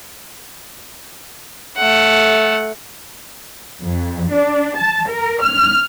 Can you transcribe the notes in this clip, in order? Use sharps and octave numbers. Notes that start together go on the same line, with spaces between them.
A3 F#5
F2
D4
A5
A#4
F6